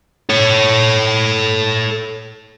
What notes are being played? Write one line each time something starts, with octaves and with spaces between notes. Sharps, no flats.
A4 C#5